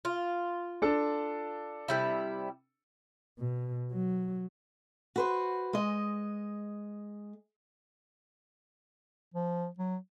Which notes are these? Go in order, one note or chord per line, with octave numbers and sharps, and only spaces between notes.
F4
D4 A4
C3 G3 E4
B2
F#3
F#4 B4 C5
G#3 D#5
F3
F#3